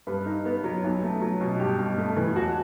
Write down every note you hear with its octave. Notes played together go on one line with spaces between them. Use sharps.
G2 B4
D#4
B3
F#3
B1
A3
F#3
B2
G2 G4
G2
A3
E3
E1 F#4